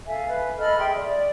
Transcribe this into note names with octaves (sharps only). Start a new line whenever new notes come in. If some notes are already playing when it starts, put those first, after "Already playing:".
A4 E5 F5 G#5
B4
A4 D#5 B5 F6
G#4 E5 G5 C6
D5